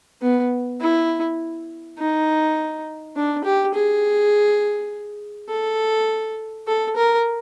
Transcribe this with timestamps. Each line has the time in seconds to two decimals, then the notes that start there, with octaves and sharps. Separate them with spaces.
0.22 B3
0.81 E4
1.99 D#4
3.16 D4
3.44 G4
3.74 G#4
5.50 A4
6.67 A4
6.96 A#4